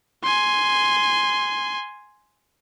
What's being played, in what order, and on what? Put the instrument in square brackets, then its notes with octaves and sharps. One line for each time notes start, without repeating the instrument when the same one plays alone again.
[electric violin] G#5 C6